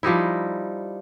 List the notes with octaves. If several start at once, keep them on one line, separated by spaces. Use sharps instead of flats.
F3 G3 D#4 E4